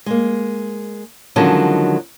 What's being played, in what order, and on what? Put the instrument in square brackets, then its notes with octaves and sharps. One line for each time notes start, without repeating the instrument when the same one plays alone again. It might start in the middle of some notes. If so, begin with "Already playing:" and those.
[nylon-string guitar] G#3 A#3
D3 D#3 F3 F#3 G#3 C#4